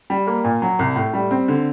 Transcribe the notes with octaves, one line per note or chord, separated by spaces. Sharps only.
G3
A#3
A#2
F#3
C2
A2
G3
C4
D3